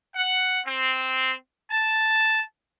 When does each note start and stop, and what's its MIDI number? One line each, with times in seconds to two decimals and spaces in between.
0.15 0.60 78
0.66 1.33 60
1.70 2.44 81